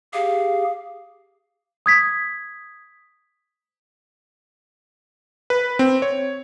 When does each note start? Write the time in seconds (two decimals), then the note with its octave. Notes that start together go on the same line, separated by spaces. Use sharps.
0.13 G4 G#4 F5
1.86 D#6 G#6 B6
5.50 B4
5.79 C4
6.02 C#5